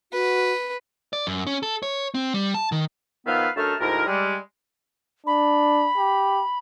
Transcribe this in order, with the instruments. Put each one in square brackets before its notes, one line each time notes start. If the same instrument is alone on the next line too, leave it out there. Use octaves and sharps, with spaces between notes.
[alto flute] F#4 [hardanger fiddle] B4
[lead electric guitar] D5
F#2
C#4
A4
C#5
C4
G3
A5
D#3
[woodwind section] D#3 F3 B3 B4 E5 F5
F#2 A3 D4 D#4 A5 F6
D2 G#2 E4 A#4
G3 G#3
[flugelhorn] D4 [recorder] B5
[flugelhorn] G4